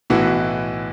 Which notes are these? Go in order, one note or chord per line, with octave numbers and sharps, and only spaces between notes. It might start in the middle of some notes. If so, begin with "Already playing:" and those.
B1 A2 E3 F#4